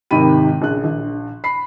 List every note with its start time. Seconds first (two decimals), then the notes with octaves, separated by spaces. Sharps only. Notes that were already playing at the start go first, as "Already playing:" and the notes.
0.11 G#1 C3 D#3 B5 D#7
0.62 A#1 C#3 F#6
0.84 A#1
1.44 B5 C7